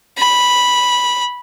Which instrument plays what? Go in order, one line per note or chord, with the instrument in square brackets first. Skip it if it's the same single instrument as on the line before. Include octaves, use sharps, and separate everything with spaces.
[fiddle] B5